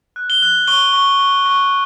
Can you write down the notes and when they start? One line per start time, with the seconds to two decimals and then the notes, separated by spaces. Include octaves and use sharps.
0.16 F#6
0.30 G7
0.42 F#6
0.67 C#6 G7
0.93 C#6
1.19 C#6
1.45 C#6